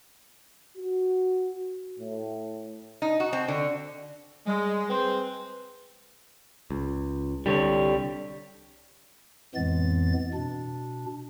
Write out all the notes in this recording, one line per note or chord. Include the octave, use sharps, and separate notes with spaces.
F#4
A2
D#4
F#4
C4
D3
G3 G#3
C4 G#4 B4 C5
C#2
C2 D3 G3 C#5
F2 A2 E3 G#3 B3 A6
B2 D4